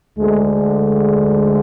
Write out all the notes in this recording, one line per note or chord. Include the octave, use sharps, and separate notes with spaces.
D2 D3 G#3